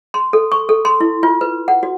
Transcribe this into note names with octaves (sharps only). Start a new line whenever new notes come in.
C6
A4
C#6
A4
C6
E4
F4
B4
F#5
F#4